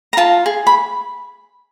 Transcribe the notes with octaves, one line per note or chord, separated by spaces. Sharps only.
A#5
F4 A5
G#4
B5